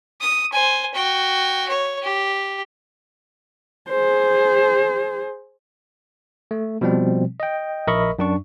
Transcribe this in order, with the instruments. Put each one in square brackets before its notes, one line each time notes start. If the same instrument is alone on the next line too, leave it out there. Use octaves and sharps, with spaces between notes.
[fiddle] D#6
C5 G#5
F#4 G5
C#5
G4
[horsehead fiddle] G#4 C5
[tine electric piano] A3
B2 F3 G3 C4
D#5 G5
A#1 A#4 D#5 E5 B5 C#6
F#2 D4 C#6